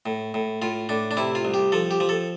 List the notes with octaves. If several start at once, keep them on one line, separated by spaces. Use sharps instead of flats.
A2
A2
A2 F4
A2 D4
D4
C3 E4
F4
C2
G4
F3 A4
G4
F3
A4